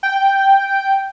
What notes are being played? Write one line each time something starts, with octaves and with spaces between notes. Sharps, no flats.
G5